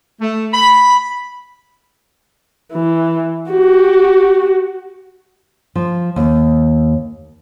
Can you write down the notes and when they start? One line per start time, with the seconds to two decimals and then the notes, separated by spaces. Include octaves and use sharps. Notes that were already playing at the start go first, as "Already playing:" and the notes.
0.21 A3
0.53 B5
2.72 E3
3.50 F#4 G4
5.75 F3
6.16 D#2